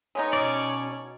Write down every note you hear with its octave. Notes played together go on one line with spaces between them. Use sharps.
G#3 B3 D#4 C#5
B2 C#4 D5